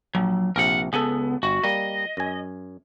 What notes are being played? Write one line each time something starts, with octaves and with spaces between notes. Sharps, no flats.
A#1 F#3
A#1 C3 A#4 F#5
C#2 B3 G#4 A4
G1 F#4
G3 A#3 D#5
F#2 G#5